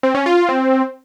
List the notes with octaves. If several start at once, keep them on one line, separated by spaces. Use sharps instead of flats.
C4
C#4
F4
F4
C4